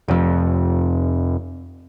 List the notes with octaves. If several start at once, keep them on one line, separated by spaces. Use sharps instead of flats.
F1 F2